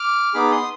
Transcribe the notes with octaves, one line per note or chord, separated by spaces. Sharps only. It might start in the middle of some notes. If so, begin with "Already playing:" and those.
Already playing: D6 F6
B3 D#4 G#4 B5 D6
C6 D#6